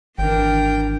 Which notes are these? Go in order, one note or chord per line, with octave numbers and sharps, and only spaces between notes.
G#1 E3 D4 A#4 G5